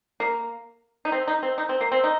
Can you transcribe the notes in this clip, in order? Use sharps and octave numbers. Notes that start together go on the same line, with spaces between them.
A#3
D#4
C4
D#4
C4
D#4
C4
A#3
C4
D#4